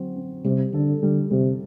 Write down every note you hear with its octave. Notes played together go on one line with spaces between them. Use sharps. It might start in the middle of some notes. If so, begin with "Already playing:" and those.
Already playing: D3 F#3 C4
C4
C3 G3
D3 A4
D3 G3
C3 G3